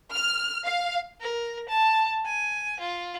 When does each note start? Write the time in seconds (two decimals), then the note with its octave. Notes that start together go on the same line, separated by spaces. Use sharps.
0.13 F6
0.66 F5
1.21 A#4
1.69 A5
2.25 G#5
2.80 F4